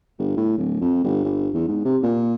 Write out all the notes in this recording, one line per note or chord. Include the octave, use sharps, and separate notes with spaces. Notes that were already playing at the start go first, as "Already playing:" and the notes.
G1
A2
D1
F2
G1
G1
E2
G#2
C3
A#2